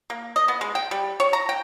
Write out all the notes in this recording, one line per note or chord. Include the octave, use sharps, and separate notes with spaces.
A#3
D#5
B3
G#3
G5
G3
C#5
A#5
G5